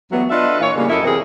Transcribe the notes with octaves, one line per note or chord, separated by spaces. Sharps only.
E2 F#3 G3 A3 B3
D4 F4 A4 B4 D#5 E5
A#2 E3 F4 C#5
A2 C#3 G3 A#3
F#2 F#3 E4 A4 D#5
C3 E3 C4 G#4 A#4